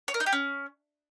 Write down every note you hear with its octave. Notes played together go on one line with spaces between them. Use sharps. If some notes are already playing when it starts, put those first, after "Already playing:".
C#5
A#4
D#4
G4
C#4